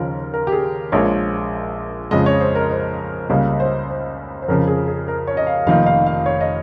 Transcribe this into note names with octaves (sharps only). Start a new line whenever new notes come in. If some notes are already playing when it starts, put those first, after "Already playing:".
Already playing: D#2 C#3 F3 A#4
A#4
G4
G#4
A#1 A#2 F3 G#3 C#5
F2 C#3 F3 G#3 D#5
C#5
C5
A#4
C5
C#2 C#3 G3 A#3 C#5
C5
C5
C5
F2 C#3 F3 A#4
G#4
G#4
A#4
C#5
D#5
F5
F1 F2 D#3 A#3 D#4 F5
F5
F5
C#5
D#5